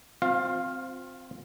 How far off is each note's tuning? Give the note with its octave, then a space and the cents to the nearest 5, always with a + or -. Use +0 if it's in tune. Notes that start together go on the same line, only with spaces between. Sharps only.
C4 +0 F4 +35 F5 +0